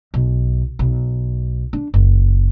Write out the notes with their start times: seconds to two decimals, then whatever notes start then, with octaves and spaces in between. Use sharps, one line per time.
0.14 B1
0.79 B1
1.73 D4
1.94 F#1